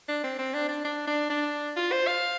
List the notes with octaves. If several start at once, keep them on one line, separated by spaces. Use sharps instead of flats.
D4
C4
C4
D4
D4
D4
D4
D4
F4
C5
F5